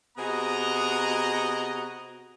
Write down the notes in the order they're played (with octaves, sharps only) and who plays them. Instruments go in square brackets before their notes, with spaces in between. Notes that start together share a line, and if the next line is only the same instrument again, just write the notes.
[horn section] C3 B3 F#4 G#4 D#5 A#5